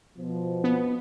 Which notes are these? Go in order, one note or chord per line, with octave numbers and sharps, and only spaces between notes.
B2 F3
B3